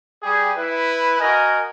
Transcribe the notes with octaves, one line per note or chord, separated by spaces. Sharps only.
G3 G4 G#4
E4 B4
F#4 A#4 D#5 G#5